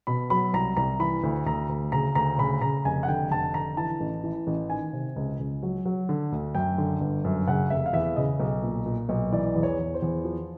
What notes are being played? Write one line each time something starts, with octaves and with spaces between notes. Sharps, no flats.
B2 B5
F#3 B5
C2 A#5
C2 A#5
E3 B5
D2
D2 A#5
D2
C#3 A#5
D2 A#5
C#3 B5
C#3 A#5
F1 G#5
F#5
D3 G5
F1 A5
D3 A#5
E3 A5
A1
E3
A1
D#3 G#5
C3
C#2
C#2
F#3
F#3
D3
D2
F#2 G5
D3
G1
F#2
C#3 F#5
F1 E5
F5
E2 E5
C#3 D#5
B1
A#2
A#2
B1
E3 D5
E2
C#5
E2
C5
E2
F3